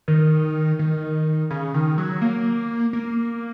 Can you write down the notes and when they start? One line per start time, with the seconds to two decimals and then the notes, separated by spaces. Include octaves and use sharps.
0.08 D#3
0.79 D#3
1.50 C#3
1.74 D#3
1.98 F#3
2.22 A#3
2.93 A#3